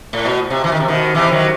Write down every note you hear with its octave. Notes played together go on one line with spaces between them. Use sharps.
A2
B2
C3
E3
D#3
C3
B2 D#3
C3 E3
D#3 F#3